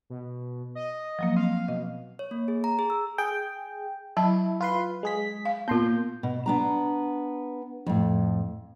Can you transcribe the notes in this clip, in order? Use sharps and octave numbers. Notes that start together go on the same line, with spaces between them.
B2
D#5
F3 F#3 A#3
C4 F5
B2 D#5
C#5
A#3
G#4
A#5
G#4
E6
G#4 G5
F#3 E4 A5
F4 B4 C6
G#3 G#4 B6
F5
A#2 B3 F4 C6 G6
B2
B3 D4 A#5
F2 A2